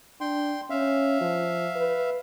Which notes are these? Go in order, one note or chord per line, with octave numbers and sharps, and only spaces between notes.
D4 G5 C6
C#4 E5 F5
F3
B4